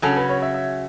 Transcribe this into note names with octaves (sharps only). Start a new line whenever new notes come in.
C#3 F#3 C#4 A4
B4
C#5
E5
E5